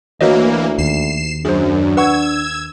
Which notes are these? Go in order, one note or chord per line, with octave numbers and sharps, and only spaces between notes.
D2 E3 A#3 F#4 C#5 D#5
D#2 C7 E7
F#2 D4 G#4 C5
B4 F#5 C#6 E6 G#6